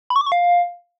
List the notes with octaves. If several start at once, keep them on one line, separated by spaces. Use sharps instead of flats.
B5
C#6
D6
C#6
F5